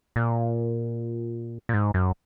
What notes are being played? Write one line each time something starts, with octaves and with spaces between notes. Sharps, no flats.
A#2
A#2
G#2
F#2